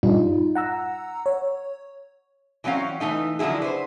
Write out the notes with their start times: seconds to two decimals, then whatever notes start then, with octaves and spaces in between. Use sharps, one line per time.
0.03 G2 A#2 G3 D#4 F4
0.55 F#5 A#5 E6
1.26 C#5
2.64 E3 F#3 C4 C#4 F5
3.00 E3 A3 D#4 D#5
3.39 D3 F3 F#3 E4 G#4
3.62 B4 C5